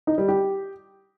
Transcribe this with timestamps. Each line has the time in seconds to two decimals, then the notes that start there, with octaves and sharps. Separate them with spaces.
0.07 D#4
0.18 G3
0.28 G4